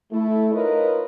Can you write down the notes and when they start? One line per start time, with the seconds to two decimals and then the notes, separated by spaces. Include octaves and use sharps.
0.11 A3 E4
0.52 D#4 F4 A#4 B4 C#5 D#5